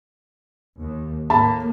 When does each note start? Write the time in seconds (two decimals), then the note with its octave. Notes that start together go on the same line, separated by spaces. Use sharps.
0.78 D#2
1.30 A2 A#3 A5 B5